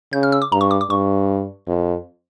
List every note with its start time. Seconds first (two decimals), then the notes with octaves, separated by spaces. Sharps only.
0.13 C#3 G6
0.23 F6
0.32 E6
0.42 D6
0.52 G2 A#5
0.61 C#6
0.71 D6
0.81 D6
0.90 G2 C#6
1.68 F2